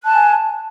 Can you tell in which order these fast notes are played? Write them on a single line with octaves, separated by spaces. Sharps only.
F#6 A5 G#5